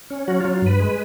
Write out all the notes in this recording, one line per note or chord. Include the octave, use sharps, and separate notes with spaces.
C#4
F#3 F#4
F4
F#3
F4
G2 B4
G#3